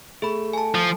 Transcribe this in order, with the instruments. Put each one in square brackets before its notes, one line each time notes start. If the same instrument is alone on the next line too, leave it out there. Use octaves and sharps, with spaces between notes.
[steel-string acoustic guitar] A3 [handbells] G#4 B5
[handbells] G#5 A5
[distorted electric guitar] F3